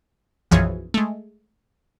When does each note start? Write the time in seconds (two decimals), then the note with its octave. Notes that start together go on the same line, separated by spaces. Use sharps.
0.51 B1 F#2 E3 F3 G#4 C#5
0.94 G#3 A3